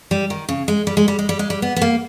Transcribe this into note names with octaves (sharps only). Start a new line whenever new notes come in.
G3
D#3
C#3
G#3
G3
G#3
G3
G#3
G3
G#3
G3
B3
B3
A#3